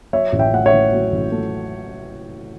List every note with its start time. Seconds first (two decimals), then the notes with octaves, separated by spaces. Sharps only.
0.13 F#3 C#5 E5
0.32 A1
0.39 E5 G5
0.53 A3 F#5
0.66 C#5 E5
0.73 A2
0.92 F#3
1.12 A1
1.32 A3